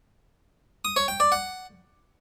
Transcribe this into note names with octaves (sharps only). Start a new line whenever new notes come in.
D#6
C#5
G5
D5
F#5